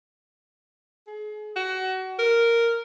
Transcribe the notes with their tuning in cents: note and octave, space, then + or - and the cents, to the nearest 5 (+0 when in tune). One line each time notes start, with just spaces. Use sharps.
G#4 +35
F#4 +25
A#4 -5